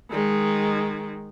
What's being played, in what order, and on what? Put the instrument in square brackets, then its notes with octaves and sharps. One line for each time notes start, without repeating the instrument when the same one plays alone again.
[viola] D#3 G#3